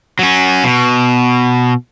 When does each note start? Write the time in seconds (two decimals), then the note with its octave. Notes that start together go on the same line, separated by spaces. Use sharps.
0.19 F#3 C#4
0.64 B2